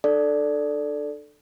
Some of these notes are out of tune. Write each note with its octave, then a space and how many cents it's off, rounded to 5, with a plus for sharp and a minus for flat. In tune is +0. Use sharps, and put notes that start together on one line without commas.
D4 +35 A4 +0 D5 +0